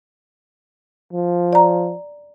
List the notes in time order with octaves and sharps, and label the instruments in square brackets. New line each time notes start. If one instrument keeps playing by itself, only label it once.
[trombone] F3
[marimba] D5 A#5